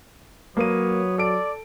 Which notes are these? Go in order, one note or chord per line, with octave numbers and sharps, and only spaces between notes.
F#3 A#3 A#4 B4 C#5 D#6 D#7
A4 D5 D7